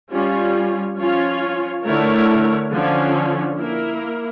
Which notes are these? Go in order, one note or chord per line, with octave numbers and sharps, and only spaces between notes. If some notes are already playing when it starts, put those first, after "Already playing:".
G3 C#4 F4
F3 C#4 F4 C#5
D3 A3 E4 A#4 C#5
D3 F3 C#4
A#3 E4 A#4